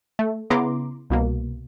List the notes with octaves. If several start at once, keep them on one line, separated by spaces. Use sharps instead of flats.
A3
C#3 B3 E4 A#5 C6 D6
C2 B2 A#3